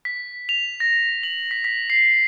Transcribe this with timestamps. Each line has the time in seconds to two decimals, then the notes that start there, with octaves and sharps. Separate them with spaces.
0.05 B6
0.49 F7
0.80 A#6
1.23 F#7
1.51 B6
1.64 B6
1.90 C7